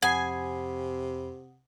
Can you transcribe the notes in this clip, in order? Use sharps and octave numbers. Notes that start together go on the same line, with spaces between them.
F2 C3 F#5 G#5 B5 D#6 C7